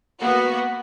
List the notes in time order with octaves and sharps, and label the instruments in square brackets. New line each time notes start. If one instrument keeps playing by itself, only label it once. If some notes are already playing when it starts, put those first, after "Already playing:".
[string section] A#3 B3 F#4